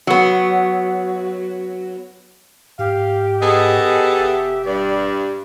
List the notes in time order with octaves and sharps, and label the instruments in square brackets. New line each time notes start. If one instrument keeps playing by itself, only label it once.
[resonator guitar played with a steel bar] F#3 B3
[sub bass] G#2 [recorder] G4 [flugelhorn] F5
[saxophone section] B3 G#4 A4 [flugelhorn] D#5
[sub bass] E1 [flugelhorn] E5
[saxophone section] G2 [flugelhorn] D5